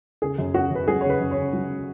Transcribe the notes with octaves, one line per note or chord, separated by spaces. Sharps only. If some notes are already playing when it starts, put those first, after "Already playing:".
C#3 G#4
F#2
F#2 F#4
F#2 B4
F#3 G#4
C#5
C#3
B4
F#2
C#5
C#3
F#3